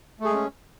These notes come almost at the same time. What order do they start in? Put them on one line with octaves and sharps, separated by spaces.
A3 G#4 G#3 C#4